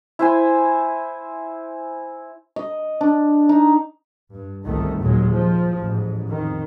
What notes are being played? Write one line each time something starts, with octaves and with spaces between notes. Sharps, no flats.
E4 C5 G#5
D#5
D4
D#4
G2
G1 C2 G#2 D#3 A3
D#2 A#2 F#3 G#3
F3
A1 G#2
F2 D#3